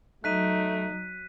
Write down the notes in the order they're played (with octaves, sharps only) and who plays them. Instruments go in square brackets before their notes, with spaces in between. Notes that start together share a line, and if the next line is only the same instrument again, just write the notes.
[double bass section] F#3 [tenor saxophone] A3 [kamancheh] D#4 [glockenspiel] F#6 B6 D#7